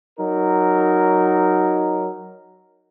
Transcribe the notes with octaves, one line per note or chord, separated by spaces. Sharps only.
F#3 D#4 A#4